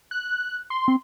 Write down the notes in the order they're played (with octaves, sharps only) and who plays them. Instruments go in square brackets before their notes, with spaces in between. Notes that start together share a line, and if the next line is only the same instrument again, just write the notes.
[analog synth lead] F#6
C6
[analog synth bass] C4